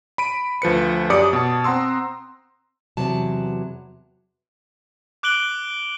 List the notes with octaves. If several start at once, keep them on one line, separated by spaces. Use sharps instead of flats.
B5 D7 D#7
D2 F3 B4 C#7
F#2 G4 D5 D6 D#6 C#7
B2 A5
C4 F#5 A#5 C6 E6
E2 C3 E3 F#3 A5
D6 F#6 D7 F#7 G7